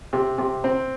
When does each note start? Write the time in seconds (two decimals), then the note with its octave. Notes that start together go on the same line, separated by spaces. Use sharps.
0.13 C3
0.38 C3
0.64 C4